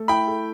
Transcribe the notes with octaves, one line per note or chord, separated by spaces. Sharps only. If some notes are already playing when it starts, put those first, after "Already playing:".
Already playing: A3 A4
E4 G5 B5
A4